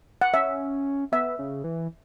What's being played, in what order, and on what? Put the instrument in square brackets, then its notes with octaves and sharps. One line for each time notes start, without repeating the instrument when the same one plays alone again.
[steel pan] F#5
[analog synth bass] C#4 [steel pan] E5
[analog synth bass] B3 [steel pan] E5
[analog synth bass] C#3
E3